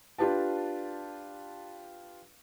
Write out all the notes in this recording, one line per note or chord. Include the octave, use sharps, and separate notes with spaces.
D4 F4 G4 B4 A5